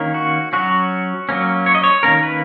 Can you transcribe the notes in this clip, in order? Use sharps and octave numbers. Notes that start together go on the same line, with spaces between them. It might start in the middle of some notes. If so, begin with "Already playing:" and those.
Already playing: D#3 A#3 C#4
F#4
F#3 C#4 F#4
F#3 A#3 C#4
C#5
D#5
C#5
D#3 A#3 C#4 A#4
B4